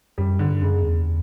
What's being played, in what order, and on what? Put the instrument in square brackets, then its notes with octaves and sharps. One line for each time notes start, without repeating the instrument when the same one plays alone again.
[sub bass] F#2 [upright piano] G3
[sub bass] G2 [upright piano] D3
[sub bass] F#2 [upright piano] C#3
[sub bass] E2